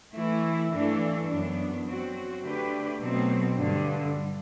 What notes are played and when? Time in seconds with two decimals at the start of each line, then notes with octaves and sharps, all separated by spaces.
0.14 E3 A3 E4
0.71 G2 E3 A3 D4 A4
1.28 F#2 F#3 B3 D4
1.85 F#3 C4 F#4
2.41 D3 A3 D4 G4 B4
2.99 B2 F#3 A3 C4
3.56 G2 D3 G3